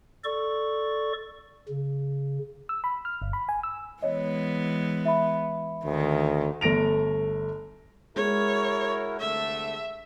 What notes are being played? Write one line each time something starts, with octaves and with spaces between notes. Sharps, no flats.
A4 D5 C#6
C#3
E6
B5
F6
G1
B5
G#5
E6
E3 G#3 B3 C#5 D#5
E5 B5
D2 D#3
G1 A3 A#6 D7 F7
G#3 E4 F#4 A#4 C#5
C2 D3 A3 E5